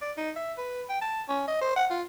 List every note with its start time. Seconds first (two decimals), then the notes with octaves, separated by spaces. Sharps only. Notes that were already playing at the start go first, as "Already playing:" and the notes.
0.02 D5
0.17 D#4
0.36 E5
0.58 B4
0.89 G5
1.01 A5
1.29 C#4
1.47 D#5
1.62 C5
1.76 F#5
1.90 F4